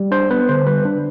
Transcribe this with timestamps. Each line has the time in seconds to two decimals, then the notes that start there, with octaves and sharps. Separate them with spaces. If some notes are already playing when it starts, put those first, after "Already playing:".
Already playing: G3
0.11 D4 C5
0.30 B3 B4
0.49 D3 C5
0.67 G3 B4
0.85 D4